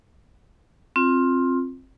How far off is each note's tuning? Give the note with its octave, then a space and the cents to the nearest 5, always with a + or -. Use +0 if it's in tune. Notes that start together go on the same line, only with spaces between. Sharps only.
C4 +15 F4 +0